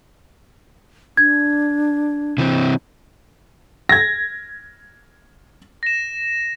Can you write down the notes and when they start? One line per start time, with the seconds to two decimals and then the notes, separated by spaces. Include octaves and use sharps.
1.17 D4 G#6
2.38 C3 E3 C4
3.89 G#6 A#6
5.83 A#6 E7